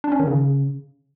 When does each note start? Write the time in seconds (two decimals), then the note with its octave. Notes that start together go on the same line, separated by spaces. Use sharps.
0.04 D4
0.12 C#4
0.20 D#3
0.27 C#3